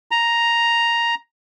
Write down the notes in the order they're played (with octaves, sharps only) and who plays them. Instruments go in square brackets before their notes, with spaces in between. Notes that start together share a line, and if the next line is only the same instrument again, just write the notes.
[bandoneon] A#5